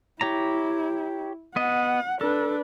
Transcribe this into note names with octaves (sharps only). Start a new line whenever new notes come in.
E4 G4 C#5 A#5
B3 D#5 F#5
D4 A4 B4